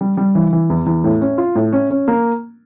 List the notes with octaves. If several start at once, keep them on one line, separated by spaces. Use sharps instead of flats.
G3
G3
E3
E3
E2
E2
A2
C#4
F4
A2
C#4
C#4
A#3